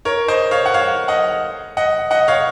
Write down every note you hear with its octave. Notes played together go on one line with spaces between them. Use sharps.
A#4 C#5
C5 D#5
C#5 F5
F#5
C#5 F5
D#5 F#5
D#5 F#5
D#5 F#5
C#5 F5